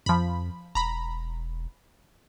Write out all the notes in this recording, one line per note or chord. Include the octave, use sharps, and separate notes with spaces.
F2 F3 B5
E1 A#5 B5